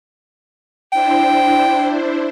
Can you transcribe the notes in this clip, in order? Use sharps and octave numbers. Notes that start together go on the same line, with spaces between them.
D4 E4 C5 G5